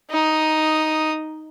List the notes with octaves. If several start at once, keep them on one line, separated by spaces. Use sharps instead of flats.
D#4 D#6